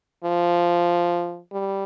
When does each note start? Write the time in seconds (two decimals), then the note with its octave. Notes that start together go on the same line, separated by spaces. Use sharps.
0.25 F3
1.53 G3